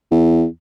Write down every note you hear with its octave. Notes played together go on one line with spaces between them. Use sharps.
E2